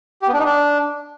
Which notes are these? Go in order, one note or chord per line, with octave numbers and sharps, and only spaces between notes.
G4
B3
D4
D#4
D4